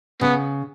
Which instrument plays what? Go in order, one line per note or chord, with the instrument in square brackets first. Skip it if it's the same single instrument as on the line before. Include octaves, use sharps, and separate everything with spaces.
[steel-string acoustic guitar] C#3 [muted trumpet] B3